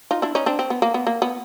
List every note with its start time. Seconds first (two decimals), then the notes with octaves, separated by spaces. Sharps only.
0.11 D#4 F4
0.22 D4 E4
0.35 C#4 D#4
0.46 C4 D4
0.59 C4
0.70 B3
0.82 A#3
0.94 B3
1.07 A#3
1.22 B3